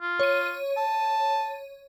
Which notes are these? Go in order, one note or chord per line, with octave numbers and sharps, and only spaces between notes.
F4
C#5 D#7
A5